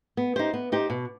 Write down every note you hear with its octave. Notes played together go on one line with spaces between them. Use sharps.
B3
D#4 G4 C5
B3
D#4 G4 C5
B2